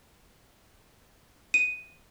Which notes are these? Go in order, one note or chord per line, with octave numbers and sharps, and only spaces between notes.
D#7